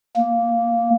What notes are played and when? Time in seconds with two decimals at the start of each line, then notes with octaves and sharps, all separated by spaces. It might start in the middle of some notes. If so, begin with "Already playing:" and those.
0.16 A#3